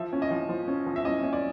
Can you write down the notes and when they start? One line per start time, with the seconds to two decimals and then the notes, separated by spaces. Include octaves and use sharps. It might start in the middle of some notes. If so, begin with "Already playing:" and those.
Already playing: F3 E5
0.13 C#4
0.22 D#5
0.31 F3
0.49 F3
0.68 C#4
0.87 F3
0.96 E5
1.05 C#4 D#5
1.23 C#4
1.33 D5